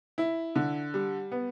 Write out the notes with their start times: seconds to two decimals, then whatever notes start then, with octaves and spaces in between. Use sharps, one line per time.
0.18 E4
0.55 D3
0.94 G3
1.32 B3